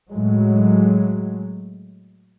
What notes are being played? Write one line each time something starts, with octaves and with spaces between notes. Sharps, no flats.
A2 F#3 G#3